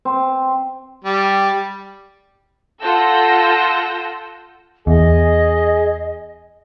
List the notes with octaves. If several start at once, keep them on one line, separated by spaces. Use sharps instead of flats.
C4
G3
F4 A4 F#5 E6 G6 A#6
E2 G#4 D#5